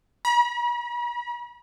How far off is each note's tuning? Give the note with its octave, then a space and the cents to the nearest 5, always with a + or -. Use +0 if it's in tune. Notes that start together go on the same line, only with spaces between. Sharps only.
B5 -45